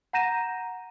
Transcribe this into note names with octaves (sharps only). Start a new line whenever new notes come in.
F#5 A#5 G6 A#6 D#7 E7